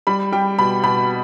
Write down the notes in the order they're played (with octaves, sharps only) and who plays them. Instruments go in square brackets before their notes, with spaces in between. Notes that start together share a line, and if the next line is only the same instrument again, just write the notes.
[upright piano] G3 B5
G3 G5
B2 B5
B2 B5